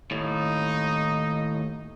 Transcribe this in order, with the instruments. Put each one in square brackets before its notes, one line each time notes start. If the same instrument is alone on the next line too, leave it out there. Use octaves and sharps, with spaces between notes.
[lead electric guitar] D#2 A2 [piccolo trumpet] D#4